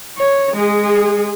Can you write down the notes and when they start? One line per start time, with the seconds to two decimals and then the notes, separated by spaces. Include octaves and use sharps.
0.18 C#5
0.53 G#3 G#4